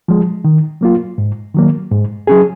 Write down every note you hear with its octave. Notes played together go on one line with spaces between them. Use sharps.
F3 G#3
D#3
F#3 A#3 F4
G#2
D#3 F#3 A#3
G#2
F#3 C#4 G#4